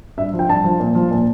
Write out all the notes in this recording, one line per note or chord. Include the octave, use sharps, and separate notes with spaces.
G2 E5
F3
G5
G2 A5
F3
A#2
F3
A#2